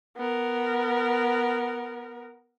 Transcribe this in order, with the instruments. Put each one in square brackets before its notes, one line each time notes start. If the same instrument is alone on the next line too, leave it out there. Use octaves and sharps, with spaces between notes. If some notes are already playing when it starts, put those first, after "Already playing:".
[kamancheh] B3 A#4